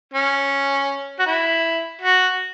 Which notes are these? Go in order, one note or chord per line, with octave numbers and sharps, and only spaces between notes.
C#4
F#4
E4
F#4